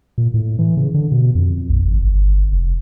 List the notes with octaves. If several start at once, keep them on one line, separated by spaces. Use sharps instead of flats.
A#2
A2
E3
C#3
D3
B2
F2
A#1
G#1
G1
F1